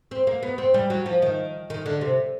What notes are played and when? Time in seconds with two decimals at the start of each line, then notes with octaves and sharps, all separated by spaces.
0.11 C4
0.27 A#3
0.43 B3
0.58 C4
0.74 G3
0.90 F#3
1.06 F3
1.22 D#3
1.70 D#3
1.86 D3
2.01 C3